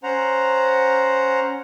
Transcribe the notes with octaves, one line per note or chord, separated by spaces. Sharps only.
C#4 C5 F#5 A#5